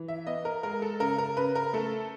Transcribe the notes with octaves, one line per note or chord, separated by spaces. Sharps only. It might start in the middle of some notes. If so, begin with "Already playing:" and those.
Already playing: E3
E5
B3 D#5
A#4
G#3 A#4
A4
C#3 A#4
A#4
C#3 B4
A#4
A3 A4